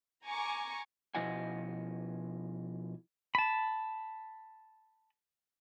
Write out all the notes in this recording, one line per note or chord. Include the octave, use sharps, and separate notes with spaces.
G#5 A#5 C#6 D6
B2 F3 E4 D#5 F#5 G#5
A5 B5